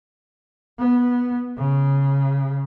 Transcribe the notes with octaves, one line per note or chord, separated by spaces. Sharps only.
B3
C#3